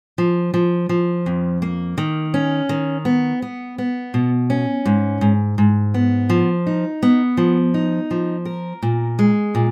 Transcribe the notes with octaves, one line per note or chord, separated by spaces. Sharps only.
F3
F3
F3
F2
A#3
D#3
C#4
D#3
B3
B3
B3
B2
C#4
G#2
G#2
G#2
B3
F3
D#4
B3
F3
D#4
F3
A#4
A#2
G#3
A#2